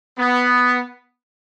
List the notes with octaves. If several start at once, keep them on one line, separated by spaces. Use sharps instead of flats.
B3